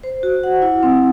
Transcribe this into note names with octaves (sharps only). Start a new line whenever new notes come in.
C5
F#4
F#5
E4
C4